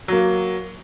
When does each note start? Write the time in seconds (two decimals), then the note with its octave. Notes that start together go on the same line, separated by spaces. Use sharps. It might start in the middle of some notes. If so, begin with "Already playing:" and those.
0.08 F#3 A#3